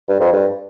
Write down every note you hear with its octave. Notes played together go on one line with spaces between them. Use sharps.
G2
F2
G2